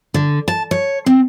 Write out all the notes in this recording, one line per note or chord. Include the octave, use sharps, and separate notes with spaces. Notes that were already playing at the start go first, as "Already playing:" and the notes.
D3
A5
C#5
C4